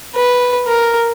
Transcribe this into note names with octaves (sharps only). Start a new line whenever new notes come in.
B4
A#4